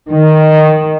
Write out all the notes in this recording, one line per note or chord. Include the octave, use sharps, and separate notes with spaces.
D#3